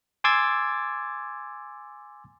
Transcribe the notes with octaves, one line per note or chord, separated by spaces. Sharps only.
G#5 C6 D6 E6 G#6 A6